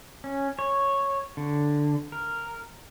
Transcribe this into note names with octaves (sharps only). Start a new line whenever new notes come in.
C#4
C#5
D3
A#4